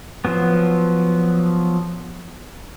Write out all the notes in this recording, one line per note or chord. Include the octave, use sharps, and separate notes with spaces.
F3 F#3 B3